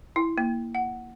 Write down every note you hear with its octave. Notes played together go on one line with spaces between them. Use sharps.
E4
A#3
F#5